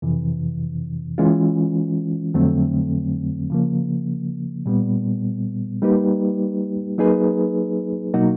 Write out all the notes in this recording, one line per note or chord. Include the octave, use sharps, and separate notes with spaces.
F2 C3 E3
E3 G#3 C#4 F4
F2 D3 F#3 A3 C4
C#3 F3 A#3
A#2 G3 B3
G3 A#3 D#4 G4 B4
F#3 A#3 D#4 G#4 B4
B2 F#3 A#3 D#4 F#4